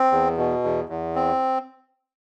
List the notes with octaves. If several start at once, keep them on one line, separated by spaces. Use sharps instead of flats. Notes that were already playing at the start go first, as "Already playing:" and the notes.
Already playing: C4
E2
B2
E2
E2
C4